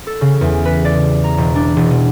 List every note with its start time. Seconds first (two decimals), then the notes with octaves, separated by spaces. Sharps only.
0.07 A4
0.21 C#3
0.41 E2
0.65 B4
0.85 D5
1.24 A#5
1.38 E1
1.56 D4
1.76 E1
1.90 B2